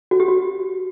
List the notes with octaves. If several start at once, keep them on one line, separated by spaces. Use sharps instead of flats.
F#4
G4
F#4